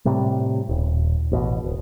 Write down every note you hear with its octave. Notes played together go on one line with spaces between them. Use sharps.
A2 C3 G3
D#1
A1 B2
D1